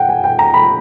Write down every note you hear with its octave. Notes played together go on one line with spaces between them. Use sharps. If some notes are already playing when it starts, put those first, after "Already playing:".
Already playing: F#5 G5
G#5
G5
A#5
B5